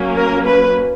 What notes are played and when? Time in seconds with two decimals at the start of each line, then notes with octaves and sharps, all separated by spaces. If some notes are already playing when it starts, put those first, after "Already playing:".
Already playing: F#3 A#3 C#4
0.16 A#4
0.46 B4